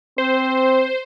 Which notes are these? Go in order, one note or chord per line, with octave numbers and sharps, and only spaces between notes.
C4 C5